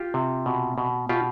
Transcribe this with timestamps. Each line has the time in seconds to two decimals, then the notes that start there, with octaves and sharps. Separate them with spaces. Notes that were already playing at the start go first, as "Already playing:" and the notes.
Already playing: F4 G4
0.14 C3
0.46 B2
0.78 B2
1.09 B2 F4 G4